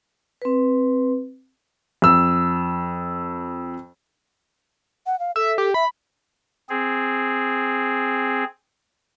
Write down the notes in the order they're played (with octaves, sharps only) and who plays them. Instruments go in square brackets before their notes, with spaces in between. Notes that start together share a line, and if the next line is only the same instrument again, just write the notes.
[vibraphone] C4 B4
[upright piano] F2 E6
[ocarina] F#5
F5
[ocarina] A4 [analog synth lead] E5
[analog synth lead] G4
[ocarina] E5 [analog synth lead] B5
[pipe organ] C4 G#4